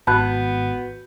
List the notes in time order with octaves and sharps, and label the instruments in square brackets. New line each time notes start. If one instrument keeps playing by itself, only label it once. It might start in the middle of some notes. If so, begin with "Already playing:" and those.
[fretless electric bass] G#1 [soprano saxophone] B3 [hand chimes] F#4 G6 [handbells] A5 B5 F#6